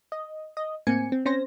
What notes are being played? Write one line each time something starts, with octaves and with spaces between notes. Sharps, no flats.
D#5
D#5
A2 A#3 C4 G#5 C#7
C4
C4 C#4 C5 A#6